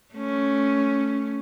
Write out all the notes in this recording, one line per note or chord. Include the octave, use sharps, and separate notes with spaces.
A3 C#4